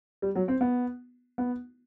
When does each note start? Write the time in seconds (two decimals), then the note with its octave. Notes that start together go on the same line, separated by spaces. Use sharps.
0.22 G3
0.35 F#3
0.48 C4
0.61 B3
1.38 B3